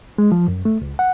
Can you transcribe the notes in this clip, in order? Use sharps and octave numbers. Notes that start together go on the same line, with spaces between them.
G#3
F3
F#2
A3
C#2
F#5